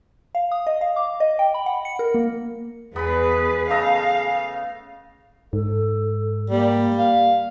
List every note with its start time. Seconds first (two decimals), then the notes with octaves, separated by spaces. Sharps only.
0.35 F5
0.52 D#6
0.67 D#5
0.81 F5
0.96 D6
1.20 D#5
1.39 G5
1.54 B5
1.66 F#5
1.85 C#7
1.99 A#4
2.14 A#3
2.96 E2 B3 G#4 B4 B5
3.70 C#3 A3 D#5 F5
5.53 G#2 A4
6.50 G3 A#3
6.98 F5